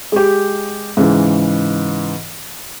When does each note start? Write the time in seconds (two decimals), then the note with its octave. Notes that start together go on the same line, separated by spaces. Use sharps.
0.12 G#3 G4
0.97 G#2 C#3 E3